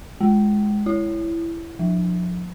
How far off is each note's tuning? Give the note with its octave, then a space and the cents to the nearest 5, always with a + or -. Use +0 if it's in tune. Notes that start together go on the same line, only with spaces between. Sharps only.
G#3 +5
E4 +15
F3 +35